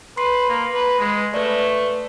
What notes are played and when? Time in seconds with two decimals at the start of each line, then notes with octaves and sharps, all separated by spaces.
0.17 B4 C6 C7
0.50 A#3
0.74 B4
0.99 G#3
1.34 A3 B4 D5